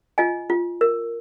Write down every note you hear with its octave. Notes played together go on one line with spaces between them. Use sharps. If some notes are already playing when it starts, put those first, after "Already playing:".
F4 D#5 G#5
F4
A#4